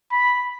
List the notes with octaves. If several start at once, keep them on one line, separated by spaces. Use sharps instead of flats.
B5